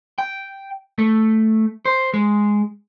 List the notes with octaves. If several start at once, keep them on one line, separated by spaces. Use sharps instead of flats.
G5
A3
C5
G#3